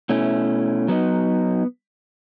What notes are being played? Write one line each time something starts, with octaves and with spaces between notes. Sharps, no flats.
B2 A3 C#4 E4
F#3 B3 D#4